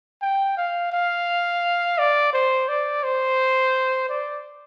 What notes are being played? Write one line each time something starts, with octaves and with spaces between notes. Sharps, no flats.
G5
F5
F5
D5
C5
D5
C5
D5